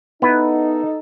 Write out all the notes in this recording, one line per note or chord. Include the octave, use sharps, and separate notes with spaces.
B3 D#4 E4 A4 B4